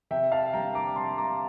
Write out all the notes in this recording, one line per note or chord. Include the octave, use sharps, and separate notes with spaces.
C3 E5 G5
F5 A5
G3 A#3 D4 G5 A#5
A#5 D6
C3 A5 C6
A#5 D6